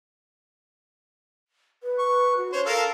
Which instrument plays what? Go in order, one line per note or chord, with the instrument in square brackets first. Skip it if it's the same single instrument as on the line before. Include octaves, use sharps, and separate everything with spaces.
[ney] B4
[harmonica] C#6
[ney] F#4
[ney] D4 [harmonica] C5 C#5
[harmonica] A4 A#4 F5